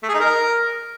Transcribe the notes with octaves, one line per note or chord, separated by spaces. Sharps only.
A3
G#4
D#4
A#4